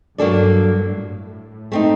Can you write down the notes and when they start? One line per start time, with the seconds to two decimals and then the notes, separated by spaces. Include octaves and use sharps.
0.18 G2 F#3 A#3 D4 A4 D5
0.95 A2
1.72 A3 C4 D#4